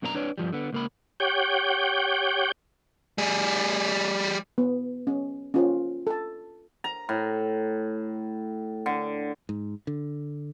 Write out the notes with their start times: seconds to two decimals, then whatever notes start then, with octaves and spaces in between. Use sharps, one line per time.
0.02 F#2 B2 A#3 D4 G4 A#5
0.14 D4 B4 C#5 D5
0.38 G2 F3 G3
0.53 D3 B3
0.73 C#2 A#3 B5
1.20 G4 C#5 F#5 G5 G6
3.18 G3 G#4
4.58 B3
5.07 C#4
5.54 C#4 F4 C5
6.07 A4 A5
6.84 A#5
7.09 A2
8.86 D3
9.49 G#2
9.87 D3